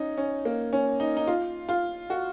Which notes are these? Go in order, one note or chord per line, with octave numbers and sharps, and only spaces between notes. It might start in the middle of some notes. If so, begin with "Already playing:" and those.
Already playing: C#4 D#4
C#4
A#3
C#4
D#4
D#4
F4
F4
F#4